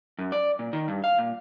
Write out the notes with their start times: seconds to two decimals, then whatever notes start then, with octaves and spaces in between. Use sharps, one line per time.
0.19 F#2
0.32 D5
0.59 A#2
0.73 D#3
0.88 G2
1.04 F5
1.18 A#2